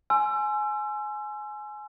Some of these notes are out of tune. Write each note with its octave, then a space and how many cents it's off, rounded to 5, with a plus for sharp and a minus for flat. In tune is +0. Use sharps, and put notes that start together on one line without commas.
G#5 +20 C6 +0 E6 +35